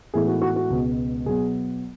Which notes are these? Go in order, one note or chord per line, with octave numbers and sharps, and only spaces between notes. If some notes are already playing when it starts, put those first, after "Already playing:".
A2 E3 G#3 B3 G#4
F#4
F#4
F#4
C#2 B2 G#3 B3
B2 F#3 B3 G#4